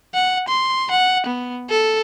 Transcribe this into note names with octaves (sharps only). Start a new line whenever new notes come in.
F#5
C6
F#5
B3
A4